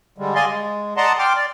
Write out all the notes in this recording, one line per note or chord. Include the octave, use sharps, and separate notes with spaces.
D3 G3 G#3
D5 D#5 F5 G#5 C6
G#3
D5 D#5 F#5 A5 A#5 C6
G5 C6 D6 F6
D5